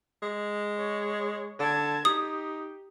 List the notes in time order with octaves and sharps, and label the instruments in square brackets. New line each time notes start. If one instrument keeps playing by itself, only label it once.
[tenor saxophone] G#3
[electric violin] C#5
[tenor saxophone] D3 [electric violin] A5 G#6
[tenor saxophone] D#4 [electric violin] G4 [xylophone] D#6